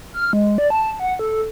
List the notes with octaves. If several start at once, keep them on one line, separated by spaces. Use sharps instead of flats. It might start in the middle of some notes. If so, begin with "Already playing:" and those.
F6
G#3
D5
A5
F#5
A4